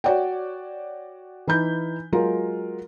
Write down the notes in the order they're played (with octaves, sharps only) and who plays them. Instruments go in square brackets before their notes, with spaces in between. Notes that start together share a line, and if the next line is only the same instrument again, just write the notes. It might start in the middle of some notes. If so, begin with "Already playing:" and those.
[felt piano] F#4 C#5 D5 F#5 G5
E3 D#4 B5 G6
F#3 G#3 F4 A#4